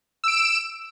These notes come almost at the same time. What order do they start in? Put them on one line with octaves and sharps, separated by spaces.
E6 D7 E7